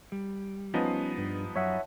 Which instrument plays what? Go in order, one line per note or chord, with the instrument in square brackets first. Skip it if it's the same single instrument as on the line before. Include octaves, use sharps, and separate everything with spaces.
[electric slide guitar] G3
[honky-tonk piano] F3 B3 D#4 [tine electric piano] C#4
[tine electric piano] G2
[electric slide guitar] F#2 [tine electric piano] C#5 E5 F#5